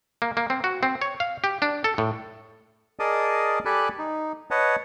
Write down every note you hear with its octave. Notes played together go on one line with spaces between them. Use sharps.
A#3
A#3
C4
F#4
C4
C#5
F5
G4
D4
A4
A2
G#4 A#4 D5 D#5 A5 D#6
G4 A4 D5 G#5 B5 F#6
D#4
B4 C#5 D#5 F#5 A5